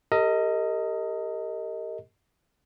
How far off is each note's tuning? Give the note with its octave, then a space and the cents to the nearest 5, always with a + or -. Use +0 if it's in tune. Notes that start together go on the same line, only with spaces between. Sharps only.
G4 +15 A#4 -35 D#5 +15